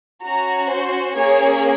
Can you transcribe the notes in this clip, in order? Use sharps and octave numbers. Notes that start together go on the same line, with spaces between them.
C#4 F#4 A#5
C5
A#3 C#4 G#4 C#5